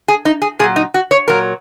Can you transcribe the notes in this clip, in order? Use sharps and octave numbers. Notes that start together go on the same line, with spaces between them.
G#4
D#4
G#4
A#2 F#3 G#4
D#4
F#4
C#5
A#2 F#3 A#4